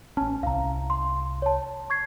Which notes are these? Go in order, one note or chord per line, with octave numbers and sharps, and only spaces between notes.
A1 C#4 A5
C2 C3 F5 A#5
C6
C#5 A5
C#6 G#6 C7